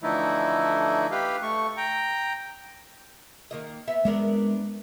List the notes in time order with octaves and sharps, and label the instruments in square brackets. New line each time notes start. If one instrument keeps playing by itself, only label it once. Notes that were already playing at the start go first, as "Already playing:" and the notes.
[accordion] D3 E3 F3 A3 D#4 E4
G4 B4 F5
A3 C#6
G5 A#5
[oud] D#3 A#3 D#5
B3 E5
[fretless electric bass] G#3 [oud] B3 D4 A#4